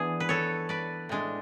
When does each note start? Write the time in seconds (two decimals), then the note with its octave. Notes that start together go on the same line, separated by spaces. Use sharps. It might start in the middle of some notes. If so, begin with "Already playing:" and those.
Already playing: E3 B3 D4 G#4
0.20 B4
0.29 A4 C#5
0.69 B4 D5
1.09 A2 G#3 D4